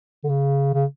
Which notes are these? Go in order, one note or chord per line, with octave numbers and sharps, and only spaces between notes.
D3
C#3
C#3